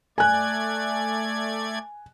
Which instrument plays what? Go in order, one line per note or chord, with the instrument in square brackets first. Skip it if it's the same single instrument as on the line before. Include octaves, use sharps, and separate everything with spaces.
[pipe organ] A3 D5 G#6 [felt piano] G#5 F#6